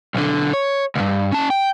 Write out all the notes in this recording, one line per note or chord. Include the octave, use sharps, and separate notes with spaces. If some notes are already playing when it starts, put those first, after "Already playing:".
B1 D3
C#5
C#2 G2
C#4 A5
G5